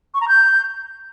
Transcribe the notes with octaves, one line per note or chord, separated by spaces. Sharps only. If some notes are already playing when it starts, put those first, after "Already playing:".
C#6
A#5
G6